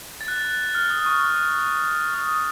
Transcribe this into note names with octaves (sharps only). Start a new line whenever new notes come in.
A6
F#6
F6
D#6
C#6
D#6